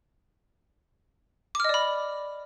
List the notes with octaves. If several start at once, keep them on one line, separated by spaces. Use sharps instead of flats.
D5 D#5 B5 D6 F6